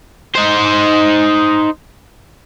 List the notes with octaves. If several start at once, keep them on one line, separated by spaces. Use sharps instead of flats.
D#4 C5